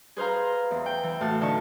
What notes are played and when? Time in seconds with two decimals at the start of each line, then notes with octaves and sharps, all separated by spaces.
0.17 G#4 B4 C5 F5 A#5
0.71 E2
0.86 G5
1.03 E3
1.21 A2 F#4 F5 A5
1.41 D3 D#4 A5 C#6